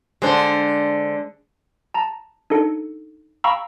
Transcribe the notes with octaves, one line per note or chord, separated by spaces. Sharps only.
D3 G#3 D4 C5
A5 A#5
D4 D#4 A4 C#7
F5 G5 A#5 B5 C#6 E6